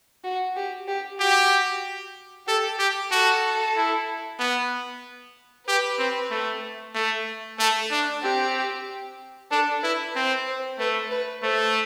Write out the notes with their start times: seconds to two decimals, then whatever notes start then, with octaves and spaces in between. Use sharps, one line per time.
0.24 F#4
0.56 G4
0.88 G4
1.20 F#4 G4
2.47 G4 A4
2.79 G4
3.11 F#4 A4
3.76 E4
4.40 B3
5.67 G4 B4
5.99 C4
6.31 A3
6.95 A3
7.59 A3 A4
7.91 D4
8.23 C4 G4
9.51 D4 A4
9.83 E4 B4
10.16 C4 C5
10.46 C5
10.79 A3 B4
11.11 B4
11.43 A3 C5